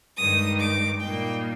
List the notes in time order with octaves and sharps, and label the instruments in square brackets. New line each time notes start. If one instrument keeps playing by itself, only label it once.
[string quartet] G2 D#3 G#3 D#4 D#6
D6
A#2 G3 A#3 D#4 G5